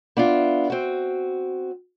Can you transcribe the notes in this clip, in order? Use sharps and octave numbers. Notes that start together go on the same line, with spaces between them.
B3 D4 E4 F4
C4 F#4